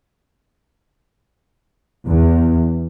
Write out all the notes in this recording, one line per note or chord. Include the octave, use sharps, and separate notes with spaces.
E2